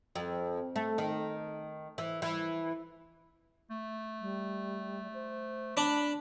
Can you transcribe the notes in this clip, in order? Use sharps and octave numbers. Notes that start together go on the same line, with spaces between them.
F2
A3
D#3
E3
E3
A3
G3
C5
D4 B5